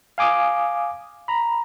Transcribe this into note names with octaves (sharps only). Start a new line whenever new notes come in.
F5 G#5 D6 D#6
A#5 B5